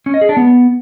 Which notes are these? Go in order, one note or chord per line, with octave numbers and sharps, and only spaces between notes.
C#4
D#5
G#4
D4
B3